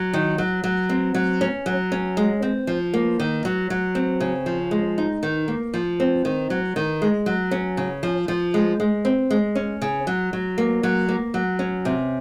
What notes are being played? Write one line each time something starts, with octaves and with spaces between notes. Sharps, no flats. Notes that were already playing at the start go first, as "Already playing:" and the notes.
Already playing: F#3
D#3
F#3
F#3
C4
F#3
C#4
F#3
C#4
G#3
C4
F3
A#3
D#3
F#3
F#3
C4
C#3
F3
G#3
D#4
D#3
A#3
F3
C4
D#3
F#3
D#3
G#3
F#3
C#4
C#3
F3
F3
G#3
G#3
C4
G#3
C#4
C#3
F#3
F#3
A#3
F#3
A#3
F#3
C#4
C3